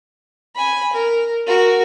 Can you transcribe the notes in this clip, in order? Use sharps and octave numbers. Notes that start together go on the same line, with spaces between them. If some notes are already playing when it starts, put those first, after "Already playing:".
G#5 B5
A#4
F#4 A#4